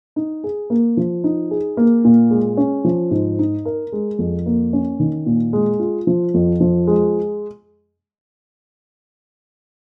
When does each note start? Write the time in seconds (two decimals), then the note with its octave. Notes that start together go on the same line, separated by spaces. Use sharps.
0.16 D#4
0.44 G#4
0.70 A#3
0.97 F3
1.24 D#4
1.51 G#4
1.77 A#3
2.04 A#2
2.31 G#3
2.57 C#4
2.85 F3
3.11 G#2
3.39 D#4
3.65 A#4
3.92 G#3
4.19 F2
4.46 A#3
4.73 C#4
5.00 D#3
5.26 A#2
5.53 G#3
5.79 F4
6.07 F3
6.34 F2
6.60 F3
6.87 G#3